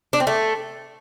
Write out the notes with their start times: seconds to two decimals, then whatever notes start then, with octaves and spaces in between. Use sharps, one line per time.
0.13 D4
0.20 C4
0.27 A3